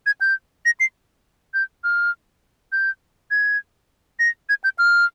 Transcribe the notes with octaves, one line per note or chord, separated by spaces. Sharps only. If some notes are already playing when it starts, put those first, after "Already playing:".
G#6
G6
A#6
C7
G6
F6
G6
G#6
A#6
G#6
G6
F6